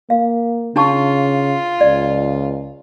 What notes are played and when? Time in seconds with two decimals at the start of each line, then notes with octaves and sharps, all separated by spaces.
0.10 A#3 F5
0.76 C#3 D4 F4 A5 C#6
1.81 C#2 D5